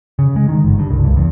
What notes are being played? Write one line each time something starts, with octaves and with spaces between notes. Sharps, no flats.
C#3
G#3
D#3
G1
G2
C2
C#2
E2